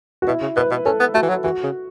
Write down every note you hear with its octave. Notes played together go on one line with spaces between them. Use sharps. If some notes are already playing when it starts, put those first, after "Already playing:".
F#4
B2 E4
C#3
B2 B4
B2
C#4 A4
B3
A3 F#4
E3
F#3
E3 F#4
C#3